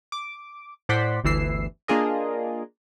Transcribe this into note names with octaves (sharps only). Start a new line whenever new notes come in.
D6
A2 C5 D5 F#5 C6 B6
G1 D2 E3 E6 C7
A#3 D4 F4 G#4 A#4 D#5